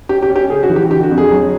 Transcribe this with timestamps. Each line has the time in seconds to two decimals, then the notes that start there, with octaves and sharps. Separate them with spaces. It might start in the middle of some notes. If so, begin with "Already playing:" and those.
0.09 C#4 G4
0.23 G4
0.29 C#4
0.36 G4
0.50 C#3 G#4
0.63 F#4
0.70 E3
0.76 G4
0.90 D3 G4
1.03 F#4
1.11 F2
1.18 G#4
1.31 F#3